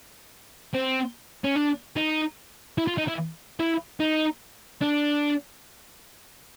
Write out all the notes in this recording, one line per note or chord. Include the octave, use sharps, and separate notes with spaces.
C4
C#4
D4
D#4
E4
F4
D#4
E4
E4
D#4
D4